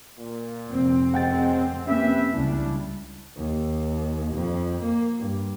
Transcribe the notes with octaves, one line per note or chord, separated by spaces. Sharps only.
A#2
F1 C4
F#2 G#3 F#5 G5 A6
A#3 C#4 G4 B4 E5
C#2 C#3 G3 D4 E4
D#2
F2
A#3
G2